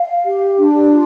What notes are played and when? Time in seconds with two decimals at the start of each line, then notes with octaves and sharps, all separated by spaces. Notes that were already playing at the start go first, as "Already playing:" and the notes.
Already playing: F5
0.26 G4
0.58 D4
0.91 F4